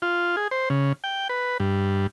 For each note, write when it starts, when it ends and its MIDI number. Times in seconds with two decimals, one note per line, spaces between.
0.02 0.36 65
0.37 0.48 68
0.51 0.69 72
0.70 0.93 49
1.04 1.28 79
1.29 1.58 71
1.60 2.07 43